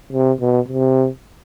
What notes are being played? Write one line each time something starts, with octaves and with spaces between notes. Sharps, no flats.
C3
B2
C3